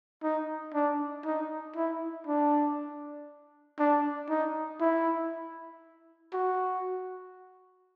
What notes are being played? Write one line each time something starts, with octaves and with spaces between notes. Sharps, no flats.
D#4
D4
D#4
E4
D4
D4
D#4
E4
F#4